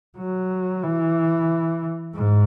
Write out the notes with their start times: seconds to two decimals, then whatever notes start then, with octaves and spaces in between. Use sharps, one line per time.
0.18 F#3
0.83 E3
2.14 G#2